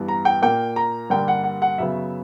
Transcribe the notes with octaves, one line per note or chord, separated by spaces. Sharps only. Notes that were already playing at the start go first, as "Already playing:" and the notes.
Already playing: G2 E3 B3
A#5
G5
A#2 A#3 G5
A#5
G2 D3 G3 A#3 G5
F#5
F#5
F#5
F#2 C#3 F#3 B3 E5